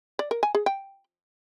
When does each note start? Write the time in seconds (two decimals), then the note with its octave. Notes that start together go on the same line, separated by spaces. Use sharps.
0.19 D5
0.31 A#4
0.43 G#5
0.55 G#4
0.66 G5